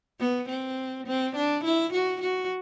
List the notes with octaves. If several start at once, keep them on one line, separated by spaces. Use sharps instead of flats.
B3
C4
C4
D4
E4
F#4
F#4